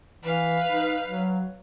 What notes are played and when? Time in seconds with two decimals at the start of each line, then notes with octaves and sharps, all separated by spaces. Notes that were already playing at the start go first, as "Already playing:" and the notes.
0.23 E3 B4 F5
0.68 D#4
1.05 F#3